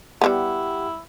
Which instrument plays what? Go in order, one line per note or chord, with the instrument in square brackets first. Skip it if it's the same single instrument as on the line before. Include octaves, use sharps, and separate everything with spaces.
[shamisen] G3 A#3 B3 [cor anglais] E4 [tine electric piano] G4 F#5